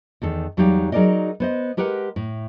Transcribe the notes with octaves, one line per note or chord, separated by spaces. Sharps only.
E2 D#3 A4
E2 F#3 G3 D#4 G4 F5
F#3 D#4 G#4 A#4 D5 D#5
B3 C5 D#5
G#3 G4 A#4 B4 F#5
A2